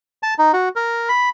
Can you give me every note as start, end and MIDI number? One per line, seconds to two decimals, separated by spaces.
0.23 0.34 81
0.39 0.52 63
0.53 0.69 66
0.76 1.09 70
1.09 1.29 83